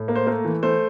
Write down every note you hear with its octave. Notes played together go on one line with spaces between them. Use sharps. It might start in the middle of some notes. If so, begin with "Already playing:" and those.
Already playing: A2
A#3
C5
A3 A#4
E3
A3 C5